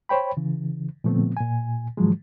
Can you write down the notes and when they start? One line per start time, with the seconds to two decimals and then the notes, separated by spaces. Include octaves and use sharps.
0.09 C5 C#5 G5 B5
0.37 C#3 E3
1.04 A#2 D3 F3 A3 B3 C4
1.37 A#2 G#5
1.97 G#2 D#3 F3 F#3 G#3